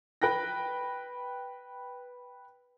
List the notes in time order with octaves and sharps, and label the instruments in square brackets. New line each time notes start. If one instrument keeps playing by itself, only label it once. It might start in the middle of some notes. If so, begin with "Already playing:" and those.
[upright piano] B4 G5 F#6 A#6